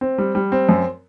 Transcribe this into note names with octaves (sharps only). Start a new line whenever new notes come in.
C4
G3
G3
C4
F#2